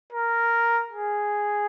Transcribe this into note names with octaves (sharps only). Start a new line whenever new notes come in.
A#4
G#4